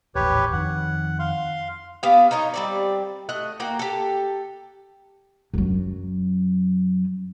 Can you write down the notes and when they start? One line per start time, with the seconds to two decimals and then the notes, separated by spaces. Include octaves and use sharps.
0.15 D#1 A1 G4 B4 C#5
0.53 F2 D#3 F#5
1.19 F5 C6
2.03 B3 F4 G4 F5
2.31 D#4 A#4 C#5 D#5
2.54 G3 C4 D5
3.29 A3 D#5 F#5
3.60 A#3 F#4 G5
3.79 G4 A4
5.54 F#2 F#3